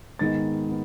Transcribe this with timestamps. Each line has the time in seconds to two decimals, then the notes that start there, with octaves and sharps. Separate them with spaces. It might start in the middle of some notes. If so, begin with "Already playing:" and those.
0.19 G#2 D#3 G#3 B3 D#4 A6
0.69 B3